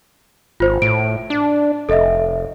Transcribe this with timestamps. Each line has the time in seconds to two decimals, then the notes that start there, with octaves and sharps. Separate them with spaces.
0.60 G#1 F4 C5
0.82 A2 D7
1.30 D4
1.89 F1 A4 D#5 E5